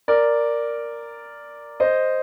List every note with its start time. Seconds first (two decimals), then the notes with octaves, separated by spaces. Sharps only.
0.08 A#4 D5
1.80 C5 D#5